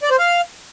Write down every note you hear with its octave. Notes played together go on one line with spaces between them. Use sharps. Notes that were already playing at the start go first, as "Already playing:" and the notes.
D5
C5
F5